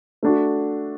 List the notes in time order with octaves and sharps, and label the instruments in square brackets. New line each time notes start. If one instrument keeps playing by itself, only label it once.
[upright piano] A3 D4 F#4